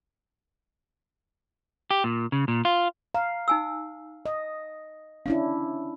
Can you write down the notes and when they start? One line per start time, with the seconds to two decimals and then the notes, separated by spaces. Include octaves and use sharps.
1.91 G4
2.04 A#2
2.32 C#3
2.48 A#2
2.65 F4
3.14 F5 A#5
3.48 D#4 G#5 E6
4.26 D#5
5.26 C#4 D4 E4 F5